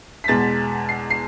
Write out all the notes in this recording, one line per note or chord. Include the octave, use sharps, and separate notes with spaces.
B6
E2 B2 G#3 A6
C7
C7